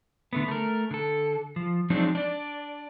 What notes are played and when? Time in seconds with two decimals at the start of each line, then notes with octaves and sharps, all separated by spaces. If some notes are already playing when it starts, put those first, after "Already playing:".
0.33 D3 A3 B3
0.48 A3 A#4
0.91 D3 A4
1.56 F3
1.90 F3 F#3 G#3 C4 D4 D#4
2.15 D4 D5